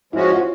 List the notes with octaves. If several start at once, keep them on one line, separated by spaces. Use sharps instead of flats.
F3 G#3 C#4 E4 F#4
F4